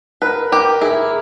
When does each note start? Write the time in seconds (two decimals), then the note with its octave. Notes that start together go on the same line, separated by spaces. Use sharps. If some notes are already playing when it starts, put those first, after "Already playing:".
0.22 A#4 B4
0.52 G4 A#4
0.81 E4 G#4